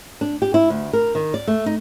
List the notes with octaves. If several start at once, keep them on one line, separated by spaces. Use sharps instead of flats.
D4
G4
E4
D2
A#4
D#3
D5
A3
D#4